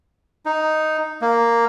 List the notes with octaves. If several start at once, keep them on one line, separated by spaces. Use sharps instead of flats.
D#4
A#3